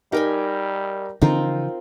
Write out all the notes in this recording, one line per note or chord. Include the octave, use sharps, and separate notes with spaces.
G3 D#4 G4 A#4 G5 G#5
C#3 E3 F3 C4 D#4 F4 A#4